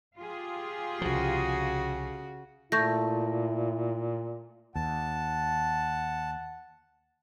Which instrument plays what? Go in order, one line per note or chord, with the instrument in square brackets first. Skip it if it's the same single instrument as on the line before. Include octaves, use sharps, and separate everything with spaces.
[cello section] F4 G4 G#4
[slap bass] C2 F3 [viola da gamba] C#3 F#4
[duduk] A#2 [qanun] A3 [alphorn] E4 [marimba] C#6 G6 A#6
[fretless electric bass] D#2 [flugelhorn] F#5 [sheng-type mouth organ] A5